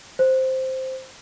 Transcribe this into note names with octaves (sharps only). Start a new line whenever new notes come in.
C5